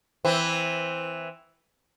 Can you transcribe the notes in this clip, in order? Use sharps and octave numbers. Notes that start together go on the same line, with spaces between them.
E3 C4